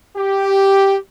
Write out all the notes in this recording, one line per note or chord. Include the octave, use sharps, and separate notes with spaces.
G4